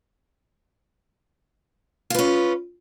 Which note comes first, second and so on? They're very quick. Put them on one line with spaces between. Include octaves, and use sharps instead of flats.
F4 B4 C#4